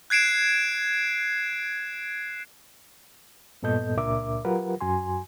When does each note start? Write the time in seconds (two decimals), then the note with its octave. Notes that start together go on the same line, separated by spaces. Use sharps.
0.10 F#6 G#6 C7 D7 E7
3.62 G2 A#2 B3 A4 D#5 G6
3.97 C#2 A#2 D4 A#4 E5 D6
4.45 F#3 F4 G4 A#4 B4 F#5
4.81 F#2 F#4 G#5 C6